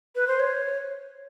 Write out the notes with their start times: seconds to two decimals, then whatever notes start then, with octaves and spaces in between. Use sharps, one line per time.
0.15 B4
0.28 C5
0.40 C#5